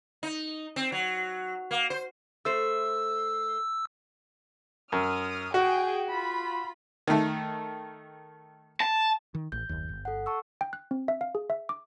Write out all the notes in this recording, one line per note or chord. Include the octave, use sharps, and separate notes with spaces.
D#4
C4
F#3
A#3
C5
A3 C5 E6
F#2 D#6 F6
F#4 G#4 G5
F4 B5
D#3 A3
A5
D#3
A1 G6
F#1 D#2
G1
A4 F#5
A5 C#6 E6
G5
F#6
C4
E5
F5
G#4
E5
D6